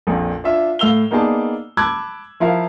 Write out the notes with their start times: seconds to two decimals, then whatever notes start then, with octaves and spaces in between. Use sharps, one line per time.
0.07 A#1 F2 A#2
0.44 D4 F4 E5
0.79 A2 F5 E6 F7 G7
1.11 A#3 B3 D#4 G#4 D5 A5
1.77 A5 B5 D6 E6 F#6 G#6
2.40 F3 E4 A#4 F5